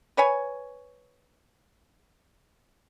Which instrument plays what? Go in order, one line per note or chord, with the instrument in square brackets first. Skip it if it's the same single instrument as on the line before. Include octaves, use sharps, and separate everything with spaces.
[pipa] B4 C#5 G#5